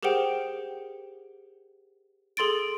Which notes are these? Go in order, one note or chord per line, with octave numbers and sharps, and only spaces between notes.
G4 G#4 A#4 C5 F#5 G5
G#4 A4 C6 A6 D7